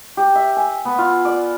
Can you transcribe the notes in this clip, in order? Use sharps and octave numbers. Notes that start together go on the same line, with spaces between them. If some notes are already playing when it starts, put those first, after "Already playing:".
G4
E5
G#5
B3
F4
D5